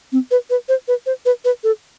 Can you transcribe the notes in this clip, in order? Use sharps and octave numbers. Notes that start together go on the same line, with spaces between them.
C4
B4
B4
C5
B4
C5
B4
B4
A4